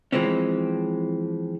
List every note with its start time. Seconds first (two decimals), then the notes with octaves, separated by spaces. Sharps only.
0.12 E3 F3 G#3 C4 C#4